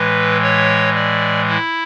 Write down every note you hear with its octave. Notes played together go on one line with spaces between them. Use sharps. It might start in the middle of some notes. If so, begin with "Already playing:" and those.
Already playing: A2 E3 G#3 B4
C#5
D5
E4